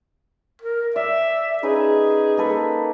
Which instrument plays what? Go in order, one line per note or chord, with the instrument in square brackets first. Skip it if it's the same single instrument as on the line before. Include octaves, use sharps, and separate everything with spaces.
[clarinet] A#4
[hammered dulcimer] D5 [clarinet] E5
[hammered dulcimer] C#4 D#4 B4 [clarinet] G#4
[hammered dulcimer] A#3 A4 B4